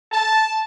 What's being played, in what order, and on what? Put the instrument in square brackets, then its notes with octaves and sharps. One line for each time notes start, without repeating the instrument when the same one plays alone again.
[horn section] A5